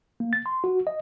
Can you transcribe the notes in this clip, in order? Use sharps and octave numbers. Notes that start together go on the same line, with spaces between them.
A#3
A6
C6
F#4
D#5